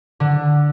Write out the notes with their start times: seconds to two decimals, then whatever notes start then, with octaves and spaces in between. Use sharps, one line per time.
0.20 D3